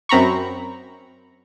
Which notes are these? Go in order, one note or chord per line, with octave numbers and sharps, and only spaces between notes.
F#2 C4 A#5 B5 C#6